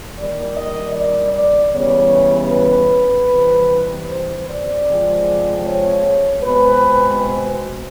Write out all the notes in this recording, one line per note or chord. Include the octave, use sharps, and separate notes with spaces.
D#3 G3 A#3 D5
D#5
D5
D5
C#3 E3 G3 B3 C#5
B4
C3 E3 G3
C5
D5
C3 F3 G#3 C4
C#5
B2 G#3 C4 B4